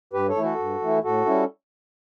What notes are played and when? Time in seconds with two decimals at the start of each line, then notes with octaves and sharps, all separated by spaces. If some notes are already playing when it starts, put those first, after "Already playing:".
0.13 G2 G4 B4
0.29 A4 C#5
0.36 E3 A3 E4
0.44 F#4 A4
0.58 G2
0.81 E3 A3 E4
1.03 A2 F#4 A4
1.25 G3 C#4 E4